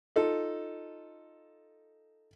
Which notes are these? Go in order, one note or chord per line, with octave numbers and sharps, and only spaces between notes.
D#4 F4 A4